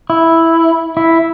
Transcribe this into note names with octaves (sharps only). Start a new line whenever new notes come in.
E4
E4